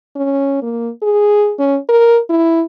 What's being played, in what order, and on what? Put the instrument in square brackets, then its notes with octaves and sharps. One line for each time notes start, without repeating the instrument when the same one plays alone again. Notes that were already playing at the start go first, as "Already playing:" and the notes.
[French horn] C#4
A#3
G#4
C#4
A#4
E4